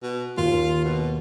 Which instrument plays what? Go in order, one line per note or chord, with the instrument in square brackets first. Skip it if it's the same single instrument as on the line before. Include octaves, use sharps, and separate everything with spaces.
[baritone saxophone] B2
[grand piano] D#2 [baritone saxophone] F4
[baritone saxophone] B2